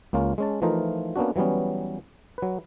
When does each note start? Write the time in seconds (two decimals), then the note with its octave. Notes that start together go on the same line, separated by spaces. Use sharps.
0.13 C#2 A#3 C#4 F4
0.38 G#3 C#4 A5
0.62 E3 F3 A3 D#4 F4 A#4
1.16 A#3 B3 C#4 D4 F#4
1.36 E3 F#3 G3 B3 C#4
2.38 F#3 B4